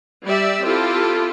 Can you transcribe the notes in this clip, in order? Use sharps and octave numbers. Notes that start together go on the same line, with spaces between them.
G3 G4 D5 E5
C4 E4 F4 G4 A4